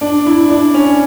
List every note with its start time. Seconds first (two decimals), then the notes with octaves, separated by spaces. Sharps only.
0.01 D4
0.26 E4
0.50 D4
0.74 C#4